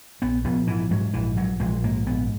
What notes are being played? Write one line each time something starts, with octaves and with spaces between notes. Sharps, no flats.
A#1 B3
A#1 B3
G#2 E3
G#2 F#3
A#1 E3
A#1 F#3
A#1 G#3
G#2 A#3
A#1 B3